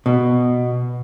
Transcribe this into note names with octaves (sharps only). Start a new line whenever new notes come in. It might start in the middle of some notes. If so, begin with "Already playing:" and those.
B2